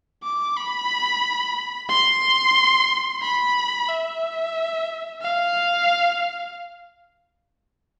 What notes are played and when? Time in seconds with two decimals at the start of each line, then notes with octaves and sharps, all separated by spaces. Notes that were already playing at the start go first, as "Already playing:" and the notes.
0.23 D6
0.57 B5
1.90 C6
3.23 B5
3.89 E5
5.21 F5